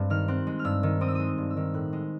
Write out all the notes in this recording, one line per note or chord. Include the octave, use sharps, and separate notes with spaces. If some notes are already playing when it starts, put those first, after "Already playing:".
Already playing: G2 G#3 C4
D#3 F6
C4 F#6
G#3
F6
G2 E6
D#3
C4 D#6
E6
G#3 D#6
G2
E6
D#3
A2 F#6
G#3